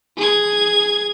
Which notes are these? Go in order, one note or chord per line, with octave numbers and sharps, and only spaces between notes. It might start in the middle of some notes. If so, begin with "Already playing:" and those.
G#4 G#6